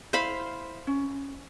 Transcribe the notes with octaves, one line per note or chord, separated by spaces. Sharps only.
E4 C5 F5 B5
C#4